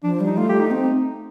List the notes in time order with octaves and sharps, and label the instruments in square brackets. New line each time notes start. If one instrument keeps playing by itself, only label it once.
[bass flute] F3 [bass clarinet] D4
[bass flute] G3
[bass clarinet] D#4
[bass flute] A3 [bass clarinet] F4
[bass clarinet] G4
D#4
[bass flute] C4